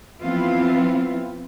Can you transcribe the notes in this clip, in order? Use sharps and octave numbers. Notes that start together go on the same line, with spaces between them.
E3 F3 B3 C4 E4 F4